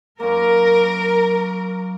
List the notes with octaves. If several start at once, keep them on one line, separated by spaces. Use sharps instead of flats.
F#2 A#3 A#4